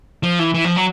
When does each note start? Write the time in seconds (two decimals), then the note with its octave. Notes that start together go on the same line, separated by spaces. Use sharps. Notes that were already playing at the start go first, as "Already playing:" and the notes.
0.23 F3
0.39 E3
0.54 E3
0.65 F3
0.76 F#3